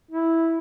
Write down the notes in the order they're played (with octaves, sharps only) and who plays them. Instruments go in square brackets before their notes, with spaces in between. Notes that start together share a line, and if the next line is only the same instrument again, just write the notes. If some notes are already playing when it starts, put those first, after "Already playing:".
[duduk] E4